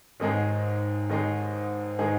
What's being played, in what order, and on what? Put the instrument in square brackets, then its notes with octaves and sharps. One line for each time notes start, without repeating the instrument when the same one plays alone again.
[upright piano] D#2 D#3 G#3 D#4 G#4 [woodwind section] G#2
[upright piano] D#2 D#3 G#3 D#4 G#4
D#3 G#3 D#4 G#4